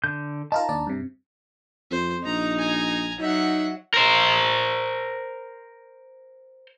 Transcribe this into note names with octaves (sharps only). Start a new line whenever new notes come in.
D3 G6
D#4 F4 A#4 A5 A#5
D#2 D4 D5
G2 C3
F2 C5
A#1 D#4 A#5
G#5 A#5
F#3 D#4 E5 F#5
A#4 C5